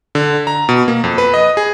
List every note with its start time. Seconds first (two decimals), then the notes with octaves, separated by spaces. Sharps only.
0.15 D3
0.47 A#5
0.69 B2
0.88 A#3
1.04 F2
1.18 B4
1.34 D#5
1.57 G#4